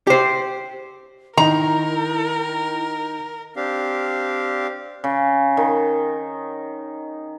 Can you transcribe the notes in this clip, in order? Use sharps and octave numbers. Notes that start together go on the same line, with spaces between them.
G4 C5
D#3 D#4 E4 A#4 A#5
C4 D4 G4 F5
C#3
D#3